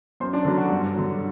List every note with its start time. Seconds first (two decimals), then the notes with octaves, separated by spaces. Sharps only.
0.20 F#2 C5 C6
0.33 D4 D5
0.45 D3 F#3
0.57 F#4 F#5
0.70 G2
0.94 D3 F#3